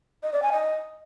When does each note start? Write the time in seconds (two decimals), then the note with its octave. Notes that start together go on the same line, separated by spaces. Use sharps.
0.23 D#5
0.33 D5
0.42 G#5
0.52 D#5